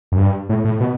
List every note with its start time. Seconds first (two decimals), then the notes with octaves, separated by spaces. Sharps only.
0.12 F#2
0.18 G2
0.49 A2
0.65 A2
0.80 B2